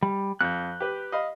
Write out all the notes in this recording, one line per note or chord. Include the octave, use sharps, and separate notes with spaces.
G3
F2 F#6 G6
G4 B4
D#5 F5 B5